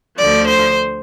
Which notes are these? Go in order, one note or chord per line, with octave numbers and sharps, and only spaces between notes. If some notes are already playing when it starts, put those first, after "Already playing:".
D2 D3 F3 D5
C5